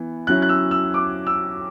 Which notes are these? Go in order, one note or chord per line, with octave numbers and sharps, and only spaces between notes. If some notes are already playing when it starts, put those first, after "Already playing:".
Already playing: E3 B3
F#3 C#4 E4 F#6
F#6
E6
E6
D6
E6